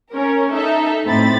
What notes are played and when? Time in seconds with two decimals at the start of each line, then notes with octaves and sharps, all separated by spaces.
0.12 C#4 A#4
0.52 D#4 A4 E5
1.06 A2 C4 B5 A6